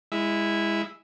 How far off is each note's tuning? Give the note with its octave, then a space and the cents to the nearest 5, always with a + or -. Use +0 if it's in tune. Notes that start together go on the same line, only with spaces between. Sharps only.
G#3 -15 E4 +0